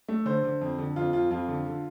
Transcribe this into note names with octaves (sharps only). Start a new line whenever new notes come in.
A3
D3 C5
D3
F2
D3
F2 F4
F2 F4
F2 F4
D3
D3